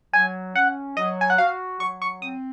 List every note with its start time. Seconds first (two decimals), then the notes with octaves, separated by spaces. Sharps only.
0.13 F#3 G#5
0.55 C#4 F#5
0.97 F#3 D#5
1.21 G#5
1.30 F#5
1.38 F#4 F5
1.80 F#3 C#6
2.02 C#6
2.22 C4 D#6